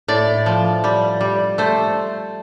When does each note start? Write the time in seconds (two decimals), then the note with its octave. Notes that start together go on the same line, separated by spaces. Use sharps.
0.08 A2 D5
0.46 F3
0.84 G3
1.21 G3
1.58 A3 C5